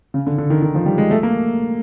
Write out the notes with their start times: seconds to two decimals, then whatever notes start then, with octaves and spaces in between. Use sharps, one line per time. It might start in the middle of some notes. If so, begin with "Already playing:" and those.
0.14 C#3
0.27 D3
0.38 D3
0.50 D#3
0.62 D#3
0.75 F3
0.86 G3
0.98 G#3
1.11 A3
1.23 A#3